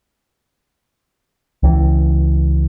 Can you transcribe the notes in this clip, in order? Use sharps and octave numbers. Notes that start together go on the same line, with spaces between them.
C#2 E3